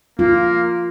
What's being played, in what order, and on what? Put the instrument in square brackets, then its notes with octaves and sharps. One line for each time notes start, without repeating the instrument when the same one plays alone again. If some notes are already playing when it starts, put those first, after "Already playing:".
[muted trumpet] A#3 [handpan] F4